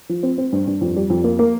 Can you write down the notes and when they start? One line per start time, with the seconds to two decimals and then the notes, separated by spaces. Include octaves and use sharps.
0.09 F3
0.23 C4
0.38 C4
0.52 G2
0.67 G2
0.81 F2
0.96 G3
1.10 F2
1.24 A#3
1.39 A#3